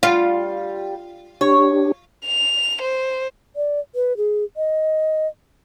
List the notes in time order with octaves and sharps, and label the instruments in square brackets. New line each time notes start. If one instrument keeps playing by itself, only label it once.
[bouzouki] G3 [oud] F4
[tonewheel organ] D4 G4 [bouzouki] C#5
[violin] F7
C5
[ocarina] D5
B4
G#4
D#5